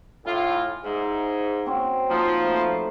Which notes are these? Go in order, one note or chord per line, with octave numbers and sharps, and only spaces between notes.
A2 E4 F4 G#5
G#2 E5
C4 C#4 F#4
F3 A#3 C4 D#4
A3 B5 C6